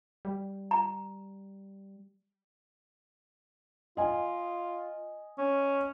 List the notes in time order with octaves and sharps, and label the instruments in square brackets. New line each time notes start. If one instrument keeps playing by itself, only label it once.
[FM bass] G3
[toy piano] A#5
[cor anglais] F4 [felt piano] D#5 G#5
[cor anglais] C#4